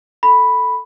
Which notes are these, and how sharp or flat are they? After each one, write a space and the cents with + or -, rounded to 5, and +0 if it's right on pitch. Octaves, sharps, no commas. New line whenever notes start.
A4 +0 B5 +0